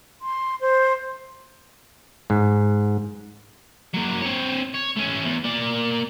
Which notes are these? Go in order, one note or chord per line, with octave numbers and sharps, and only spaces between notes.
C6
C5
G#2
F#3 A#3
C4 C#5
C#5
A3 C#4
E2
A#3 D5